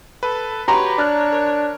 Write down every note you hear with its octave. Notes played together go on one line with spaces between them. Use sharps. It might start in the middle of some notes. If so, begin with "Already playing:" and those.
A4 B4
F#4 G4 B4 C#5 A#5 C6
D4 C#5 D5 F6 F#6
A#4